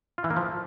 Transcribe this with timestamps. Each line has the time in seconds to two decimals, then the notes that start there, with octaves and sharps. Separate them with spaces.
0.18 F4
0.24 E3
0.30 A#3
0.37 F3